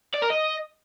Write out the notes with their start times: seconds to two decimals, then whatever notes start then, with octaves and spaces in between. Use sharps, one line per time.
0.14 D5
0.22 A#4
0.30 D#5